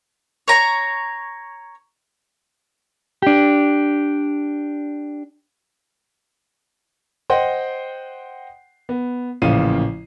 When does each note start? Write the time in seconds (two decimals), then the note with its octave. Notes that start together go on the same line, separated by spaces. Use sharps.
0.48 C#5 A#5
3.22 D4 G4
7.30 C5 D#5 F#5 G5 C6
8.89 B3
9.42 A1 A#2 C#3 F3 F5 D#7